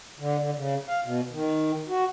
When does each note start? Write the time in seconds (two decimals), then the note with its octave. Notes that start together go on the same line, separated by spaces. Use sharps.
0.19 D3
0.39 D3
0.55 C#3
0.88 F5
1.04 B2
1.31 D#3
1.89 F#4